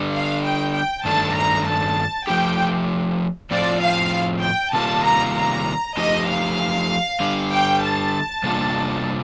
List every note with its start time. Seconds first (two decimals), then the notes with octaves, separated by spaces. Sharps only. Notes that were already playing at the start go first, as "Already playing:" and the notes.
Already playing: D3 G3 D4
0.12 F5
0.43 G5
0.74 G5
1.05 G2 D#3 A3 D4 A5
1.36 A#5
1.66 A5
2.27 F3 A3 D#4 G4 G5
3.51 A2 F3 C4 F4 D5
3.82 F5
4.43 G5
4.73 C3 D#3 G3 A#3 F4 A5
5.05 A#5
5.36 A#5
5.97 F3 A3 D#4 G4 D#5
6.28 F5
7.20 D3 G3 D4 G4
7.51 G5
7.81 A5
8.43 C3 G3 A#3 D4 F4